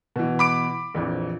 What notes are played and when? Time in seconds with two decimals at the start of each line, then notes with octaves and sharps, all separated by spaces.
0.16 B2 E3
0.39 B5 D6 D7
0.94 A#1 F2 E3